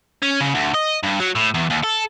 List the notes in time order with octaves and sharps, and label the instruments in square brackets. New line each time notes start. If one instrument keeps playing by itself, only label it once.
[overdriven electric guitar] C#4
C#3
D2
D#5
G2
F#3
A2
E2
D#2
A4